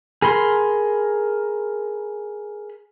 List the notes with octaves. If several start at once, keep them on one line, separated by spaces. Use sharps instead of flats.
G#4 A#4 B5 C6